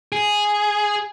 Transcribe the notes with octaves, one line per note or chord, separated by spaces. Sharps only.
G#4